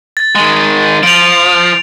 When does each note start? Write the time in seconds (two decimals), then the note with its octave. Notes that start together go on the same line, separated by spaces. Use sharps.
0.17 A6
0.35 D#3 G#3
1.03 F3 D7 F7